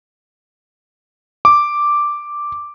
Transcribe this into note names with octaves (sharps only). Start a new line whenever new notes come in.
D6